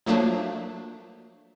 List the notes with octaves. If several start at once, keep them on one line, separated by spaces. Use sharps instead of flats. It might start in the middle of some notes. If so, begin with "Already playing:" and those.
F3 F#3 A3 A#3 D4